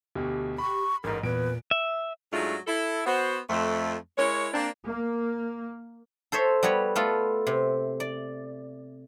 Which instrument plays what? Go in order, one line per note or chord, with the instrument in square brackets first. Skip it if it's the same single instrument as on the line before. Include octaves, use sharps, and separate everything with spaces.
[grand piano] D2 B2 [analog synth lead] G4
[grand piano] B5 [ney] C#6
[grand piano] A1 G#2 [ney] A#4
[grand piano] E2 D7 [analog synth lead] A#2 [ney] B4
[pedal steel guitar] E5
[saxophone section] G#2 F#3 G#3 A3 D4 F4
E4 A4
B3 F#4 C5
F2 A3
G#3 E4 A#4 C#5
A#3 C4 D4
[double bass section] A#3
[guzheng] A4 C5 C#5 E5
G3 B3 F#4 C#5
A3 B3 F4 A4
C3
D5